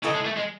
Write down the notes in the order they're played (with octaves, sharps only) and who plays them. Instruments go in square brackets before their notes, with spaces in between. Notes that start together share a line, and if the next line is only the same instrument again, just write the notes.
[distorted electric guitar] C#3 [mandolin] E4 A4 D#5 G#5
[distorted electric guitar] G#3
A3
G#3